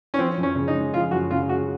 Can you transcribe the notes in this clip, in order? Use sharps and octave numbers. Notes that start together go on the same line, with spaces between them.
C#4
F3 C4
F#2
C#4
C#3
D#4
G#3
F3 F4
F#2 F#4
C#3 F4
G#3 F#4